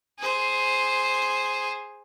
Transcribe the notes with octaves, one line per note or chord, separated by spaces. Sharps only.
G#4 C5